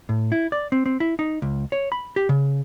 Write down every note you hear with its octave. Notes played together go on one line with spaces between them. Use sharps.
A2
E4
D5
C4
C4
E4
D#4
C#2
C#5
B5
G4
C#3